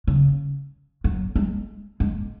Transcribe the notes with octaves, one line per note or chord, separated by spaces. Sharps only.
C#3
F#3
G#3
G#3